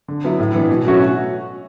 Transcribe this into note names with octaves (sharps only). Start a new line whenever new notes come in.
D3
F#3 B3 E4
A2
E3 B3 D4
B2
F#3 A3 C#4 F#4